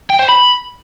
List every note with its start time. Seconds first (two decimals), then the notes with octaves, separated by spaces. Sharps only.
0.10 G5
0.19 C5
0.29 B5